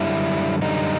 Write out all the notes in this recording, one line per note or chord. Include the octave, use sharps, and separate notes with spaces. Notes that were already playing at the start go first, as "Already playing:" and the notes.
Already playing: F#2 D3 G3 E4
F#2 D3 G3 D#4